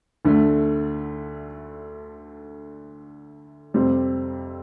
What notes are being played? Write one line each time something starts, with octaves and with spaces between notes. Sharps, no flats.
D2 D3 A3
F2 C3 G3 C4